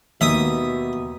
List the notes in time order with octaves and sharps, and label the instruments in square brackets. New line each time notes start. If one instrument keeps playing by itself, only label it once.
[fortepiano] D#2 [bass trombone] B2 [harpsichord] E5 D#6